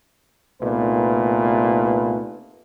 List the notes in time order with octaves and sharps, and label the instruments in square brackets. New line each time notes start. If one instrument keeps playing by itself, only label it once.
[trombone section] C2 A#2 A3 B3 D#4 B4